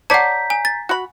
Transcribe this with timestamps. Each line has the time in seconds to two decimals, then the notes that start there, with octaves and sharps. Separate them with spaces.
0.10 C#5 D5 F#5 A5 A#5 G6 B6
0.50 G#5
0.65 A6
0.89 F#4 B5